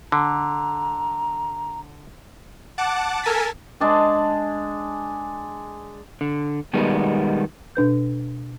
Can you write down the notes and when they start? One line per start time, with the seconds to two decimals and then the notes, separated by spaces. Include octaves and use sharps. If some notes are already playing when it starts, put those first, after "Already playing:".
0.12 D3 A#5
2.78 F#5 A5 D6
3.23 A4 A#4 G#5 A5 A6 B6
3.80 G#3 D4 A5
6.21 D3
6.73 B2 D#3 G3 G#3 B3
7.75 B2 D4 B4 G6